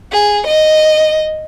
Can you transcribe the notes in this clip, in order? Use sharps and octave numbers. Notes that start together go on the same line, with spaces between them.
G#4
D#5